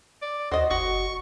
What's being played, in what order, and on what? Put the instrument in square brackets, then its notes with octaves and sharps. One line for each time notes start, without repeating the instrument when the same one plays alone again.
[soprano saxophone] D5
[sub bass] D#2 [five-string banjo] F#4 D#5 [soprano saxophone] C5
[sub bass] F#1 [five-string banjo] F#4 [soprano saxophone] C#6